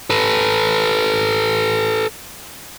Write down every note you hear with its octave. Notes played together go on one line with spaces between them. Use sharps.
A4 B4